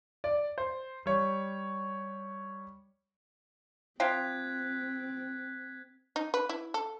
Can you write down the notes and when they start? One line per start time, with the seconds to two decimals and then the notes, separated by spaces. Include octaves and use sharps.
0.24 D5
0.58 C5
1.06 G3 C#5
4.00 F3 C4 F5 G5 F#6 G#6 B6
6.16 D#4
6.34 B4
6.49 E4
6.74 A4